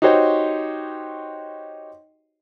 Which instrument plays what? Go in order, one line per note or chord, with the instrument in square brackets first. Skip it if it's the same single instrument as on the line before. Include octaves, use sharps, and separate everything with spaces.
[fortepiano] D#4 F#4 G4 C5 C#5 D#5